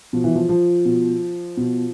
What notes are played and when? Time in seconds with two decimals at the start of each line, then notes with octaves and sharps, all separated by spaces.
0.13 B2 F3
0.24 E3
0.35 F3
0.49 F3
0.85 B2
1.57 B2